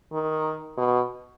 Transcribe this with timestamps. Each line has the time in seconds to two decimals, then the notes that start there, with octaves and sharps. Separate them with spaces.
0.13 D#3
0.77 B2